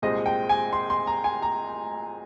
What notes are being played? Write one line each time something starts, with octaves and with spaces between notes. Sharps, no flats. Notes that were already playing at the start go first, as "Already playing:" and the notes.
C2 A#2 G#3 C4 D#5
G5
G#5
C6
C6
A#5
G#5
A#5